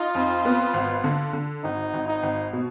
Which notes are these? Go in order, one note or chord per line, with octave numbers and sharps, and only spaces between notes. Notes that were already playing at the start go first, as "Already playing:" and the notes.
Already playing: D#4 F4
F2
B3
G#1
D3
D3
G#1 D#4
G#1
D#4
G#1
B2